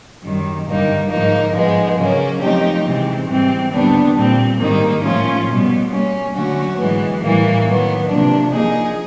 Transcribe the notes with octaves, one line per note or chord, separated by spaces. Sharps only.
F#2 D#3 G3
G2 D3 G3 A#3 D#4
G#2 F3 A#3 D#4
G#2 F3 G#3 B3
C#3 F#3 A#3 C#4
F3 A3 C4 D#4 G4
C3 E3 G#3 C4
G#2 E3 G3 C4
D#2 D3 G3 B3 D4
A#2 G3 C4
G#2 D#3 G3 A#3 D#4
A2 F3 A3 C#4 F4
B2 G3 B3
G3 A#3 C#4
D3 F#3 A3 C#4 F#4
G#2 E3 G#3 B3
A2 E3 G3 A#3
D#3 F#3 B3
C3 F3 A#3 D4
F3 A#3 D#4 G#4